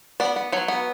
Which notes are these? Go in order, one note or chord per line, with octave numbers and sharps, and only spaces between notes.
B3 D5
B3
F#3 C#5
B3